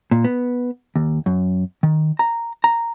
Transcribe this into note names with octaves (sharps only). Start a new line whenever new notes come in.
A#2
B3
D#2
F#2
D#3
A#5
A#5